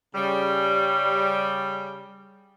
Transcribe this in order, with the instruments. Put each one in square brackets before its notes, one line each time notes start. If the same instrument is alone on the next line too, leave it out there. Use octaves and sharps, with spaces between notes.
[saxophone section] C#3 G3